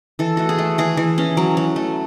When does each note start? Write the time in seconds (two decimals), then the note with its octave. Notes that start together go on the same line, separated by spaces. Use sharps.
0.19 E3 A4
0.37 A3 F#4
0.49 G#4
0.58 A3
0.78 E3 G#4
0.97 E3
1.18 C#4
1.37 F#3
1.57 F#3
1.76 A3